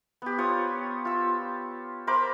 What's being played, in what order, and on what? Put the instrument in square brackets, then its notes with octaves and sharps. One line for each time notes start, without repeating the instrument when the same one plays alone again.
[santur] B3 G4
F4 C#5 D#6
F4 E6
A#4 C5 B5 D6